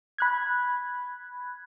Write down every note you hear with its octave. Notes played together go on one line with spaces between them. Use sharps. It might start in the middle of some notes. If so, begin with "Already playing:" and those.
B5 F#6 G#6